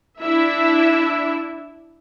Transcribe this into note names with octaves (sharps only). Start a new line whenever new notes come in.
D4 E4 E5